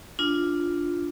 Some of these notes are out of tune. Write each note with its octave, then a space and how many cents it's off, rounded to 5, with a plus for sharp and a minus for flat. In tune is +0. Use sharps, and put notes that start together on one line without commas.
D4 +0 F4 +0